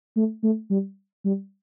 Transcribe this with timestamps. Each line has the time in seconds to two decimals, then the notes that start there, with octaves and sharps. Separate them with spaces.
0.16 A3
0.43 A3
0.70 G3
1.24 G3